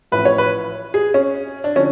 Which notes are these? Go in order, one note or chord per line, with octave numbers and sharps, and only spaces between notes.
A1 A2 F3 B4
C#5
B4
G#4
C#4
D4
D3 F3 C#4